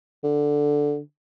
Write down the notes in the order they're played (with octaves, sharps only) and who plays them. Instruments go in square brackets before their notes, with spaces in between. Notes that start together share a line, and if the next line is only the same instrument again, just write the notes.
[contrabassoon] D3